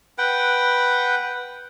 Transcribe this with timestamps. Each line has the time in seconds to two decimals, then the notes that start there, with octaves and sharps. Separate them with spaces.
0.18 B4 F#5 G5